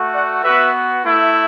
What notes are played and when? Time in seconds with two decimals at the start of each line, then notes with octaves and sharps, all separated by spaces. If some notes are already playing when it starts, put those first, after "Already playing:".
Already playing: A3 F#4
0.13 D5 F#5
0.43 B3 F#4 B4 E5
1.03 A3 E4